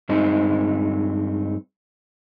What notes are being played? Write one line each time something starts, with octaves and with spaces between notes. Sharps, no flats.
G2 G#3 C4 D#4